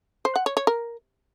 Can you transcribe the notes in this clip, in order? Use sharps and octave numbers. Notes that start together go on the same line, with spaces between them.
C5
F#5
C#5
C#5
A#4